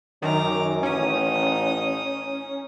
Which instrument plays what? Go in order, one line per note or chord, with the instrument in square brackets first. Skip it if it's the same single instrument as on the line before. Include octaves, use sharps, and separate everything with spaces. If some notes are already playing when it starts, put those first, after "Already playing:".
[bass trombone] F#2 [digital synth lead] D#3 [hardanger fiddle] A#5 D6
[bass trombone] A1 [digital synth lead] C#4 [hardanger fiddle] D#4 D#6